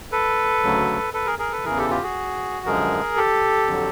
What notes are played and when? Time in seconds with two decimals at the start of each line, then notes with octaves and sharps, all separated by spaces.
0.12 A4 B4
0.64 D2 C#3 F#3
1.13 A4 B4
1.26 G#4 A#4
1.39 G#4 A#4
1.51 A4 B4
1.64 E2 C#3 E3 G#4 A#4
1.77 G4 A4
1.90 F4 G4
2.02 F#4 G#4
2.66 F#2 D3 F3 G#3 G#4 A#4
3.16 G4 A4
3.67 F2 D3 F#3